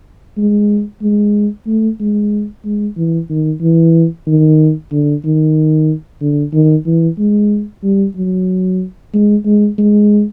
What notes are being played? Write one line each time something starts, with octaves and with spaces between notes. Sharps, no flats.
G#3
G#3
A3
G#3
G#3
E3
D#3
E3
D#3
D3
D#3
D3
D#3
E3
G#3
G3
F#3
G#3
G#3
G#3